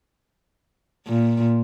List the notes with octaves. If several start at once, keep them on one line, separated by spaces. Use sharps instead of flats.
A#2